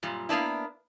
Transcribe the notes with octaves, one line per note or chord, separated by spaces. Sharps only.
F#2 A#2 G3
A#3 B3 D4 E4